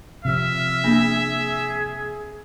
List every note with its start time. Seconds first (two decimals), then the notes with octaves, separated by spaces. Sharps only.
0.25 C3 F3 C4 E5 F6
0.84 A#3 B3 D4 G#4